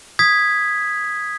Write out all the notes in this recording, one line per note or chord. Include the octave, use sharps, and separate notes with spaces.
D#6 G#6 B6